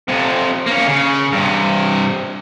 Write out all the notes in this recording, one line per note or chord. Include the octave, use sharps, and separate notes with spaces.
F2 C3
A#3 C#4
C#3
G2 C3